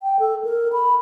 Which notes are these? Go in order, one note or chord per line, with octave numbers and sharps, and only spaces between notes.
G5
A4
A#4
B5